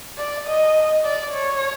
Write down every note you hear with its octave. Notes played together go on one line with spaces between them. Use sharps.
D5
D#5
D5
C#5